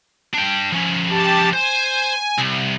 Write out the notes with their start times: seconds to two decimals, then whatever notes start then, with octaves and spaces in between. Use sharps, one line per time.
0.33 D4 G5
0.72 F3 C#4
1.10 G4 A5
1.53 C5 G#5
2.39 C2